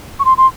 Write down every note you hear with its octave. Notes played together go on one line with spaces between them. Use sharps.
C#6
C6
C6